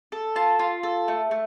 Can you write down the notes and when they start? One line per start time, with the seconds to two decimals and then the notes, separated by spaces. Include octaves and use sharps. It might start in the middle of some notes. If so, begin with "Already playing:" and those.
0.12 A4
0.36 F4 A5
0.59 F4
0.83 A4
1.08 A3
1.31 A3